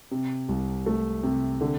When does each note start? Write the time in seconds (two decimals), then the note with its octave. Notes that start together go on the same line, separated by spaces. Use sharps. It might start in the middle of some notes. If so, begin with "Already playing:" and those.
0.11 C3
0.49 C2
0.86 A3
1.23 C3
1.61 D3